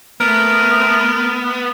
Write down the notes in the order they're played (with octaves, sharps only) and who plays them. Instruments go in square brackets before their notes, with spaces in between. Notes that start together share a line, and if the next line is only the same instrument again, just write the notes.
[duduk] A3 [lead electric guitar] B3 [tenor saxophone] A#4